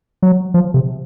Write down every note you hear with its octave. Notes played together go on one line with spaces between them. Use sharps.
F#3
F3
C3